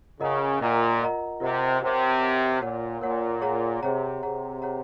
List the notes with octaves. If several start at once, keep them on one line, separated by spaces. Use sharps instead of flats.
C#3 F4 A#4 D#5 F#5 A#5
A#2 F4 A#4 D#5 F#5 A#5
F4 A#4 D#5 F#5 A#5
C3 F4 A#4 D#5 F#5 A#5
C3 A#4 C#5 F#5
A#4 C#5 F#5
A#2 A#4 C#5 F#5
A#2 A#4 C#5 F#5
G#4 C#5 F#5 A#5
C3 G#4 C#5 F#5 A#5
C3 G#4 C#5 F#5 A#5
G#4 C#5 F#5 A#5